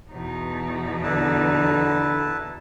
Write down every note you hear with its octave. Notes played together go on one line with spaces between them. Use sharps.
E2 B2 D#4
D3 E4 B4 A5